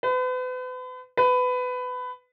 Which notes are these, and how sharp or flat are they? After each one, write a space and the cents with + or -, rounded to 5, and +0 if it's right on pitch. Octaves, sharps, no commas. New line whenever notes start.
B4 +40
B4 +20